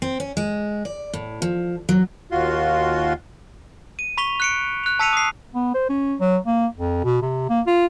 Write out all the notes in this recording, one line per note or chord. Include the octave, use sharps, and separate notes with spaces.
C4
C#4
G#3
D5
A2
F3
F#3
D#2 F4 F#4 C6
D#7
B5 C#6 B6 F7 G7
F#6 C#7 D7
F#6 F7
A5 E6 B6 C#7 D#7 F7
D#6 C7
B3
C5
C#4
F#3
A#3
F2
B2
C3
A#3
F4